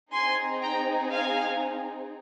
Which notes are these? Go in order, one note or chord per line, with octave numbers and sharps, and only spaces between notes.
C4 D#4 G#4 G#5 C6
G5 A#5
F5 G#5